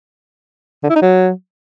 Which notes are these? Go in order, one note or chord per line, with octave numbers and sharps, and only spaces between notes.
D3
E4
D#4
F#3